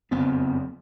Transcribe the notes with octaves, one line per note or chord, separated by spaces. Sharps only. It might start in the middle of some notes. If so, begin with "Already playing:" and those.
F#1 F2 B3 C4